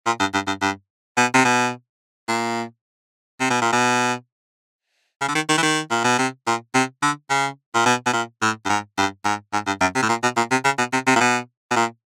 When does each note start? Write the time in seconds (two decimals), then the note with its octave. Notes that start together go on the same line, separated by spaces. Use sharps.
0.06 A#2
0.20 G2
0.34 G2
0.47 G2
0.61 G2
1.17 B2
1.34 C3
1.45 B2
2.28 A#2
3.40 C3
3.50 B2
3.62 A#2
3.72 B2
5.21 C#3
5.28 D3
5.35 D#3
5.49 D#3
5.58 E3
5.63 D#3
5.91 A#2
6.04 B2
6.19 C3
6.47 A#2
6.75 C3
7.03 D3
7.30 C#3
7.74 A#2
7.86 B2
8.06 B2
8.13 A#2
8.42 A2
8.65 G2
8.69 G#2
8.98 G2
9.25 G#2
9.53 G#2
9.67 G2
9.81 F#2
9.95 C3
10.02 A2
10.09 A#2
10.23 B2
10.37 A#2
10.51 C3
10.65 C#3
10.78 B2
10.93 C3
11.07 C3
11.16 A#2
11.21 B2
11.71 B2
11.76 A#2